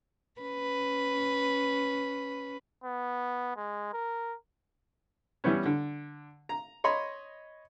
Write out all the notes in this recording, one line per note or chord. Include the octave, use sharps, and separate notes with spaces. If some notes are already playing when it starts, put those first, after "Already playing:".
C#4 B4
B3
G#3
A#4
E3 G3 B3 C#4
D3
A#5
C#5 D#5 B5 C6